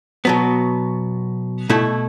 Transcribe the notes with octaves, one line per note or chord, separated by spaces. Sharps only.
B2 F#3 B3
B2 A3 E4